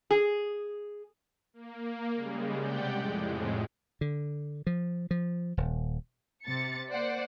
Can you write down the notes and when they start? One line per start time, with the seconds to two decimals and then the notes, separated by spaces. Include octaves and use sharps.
0.11 G#4
1.54 A#3
2.14 C#3 G3 G#3
2.56 C3 G4 D5 F#5 G5 G6
2.95 F2 A2 G#3
4.01 D3
4.67 F3
5.11 F3
5.57 D#1
6.45 C3 A6 C#7
6.90 A#3 C5 D5 F#5